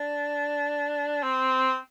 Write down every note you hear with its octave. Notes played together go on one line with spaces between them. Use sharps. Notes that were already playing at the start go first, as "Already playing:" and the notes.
Already playing: D4
C4